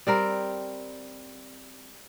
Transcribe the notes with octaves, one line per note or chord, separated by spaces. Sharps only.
G3 C4 A#4